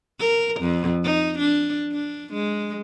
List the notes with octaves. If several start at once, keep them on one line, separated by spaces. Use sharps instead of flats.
A#4
F2
D#4
D4
D4
G#3